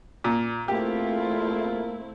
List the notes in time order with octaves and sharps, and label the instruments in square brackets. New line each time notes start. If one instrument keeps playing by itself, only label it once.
[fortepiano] A#2
[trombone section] E2 F4 [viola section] A3 C4 E4 [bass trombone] A#3 [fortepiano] G4